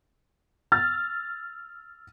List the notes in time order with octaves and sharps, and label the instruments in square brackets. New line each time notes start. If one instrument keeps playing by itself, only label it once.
[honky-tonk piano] E6 F6 A6